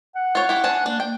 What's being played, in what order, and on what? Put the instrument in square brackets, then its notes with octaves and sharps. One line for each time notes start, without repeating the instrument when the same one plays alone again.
[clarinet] F#5
[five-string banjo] F4 C#5
E4 G4
D4 G#4 A5
[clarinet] A#3 [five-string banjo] D4
[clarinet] A#3 [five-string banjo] G5